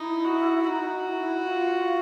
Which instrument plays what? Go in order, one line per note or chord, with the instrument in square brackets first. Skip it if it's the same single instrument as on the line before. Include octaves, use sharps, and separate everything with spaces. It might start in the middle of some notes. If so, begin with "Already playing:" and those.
Already playing: [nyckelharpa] D#4 [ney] E4
[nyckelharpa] F#4
[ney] D#4 E4 [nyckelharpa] F#4
[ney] F4
E4
F4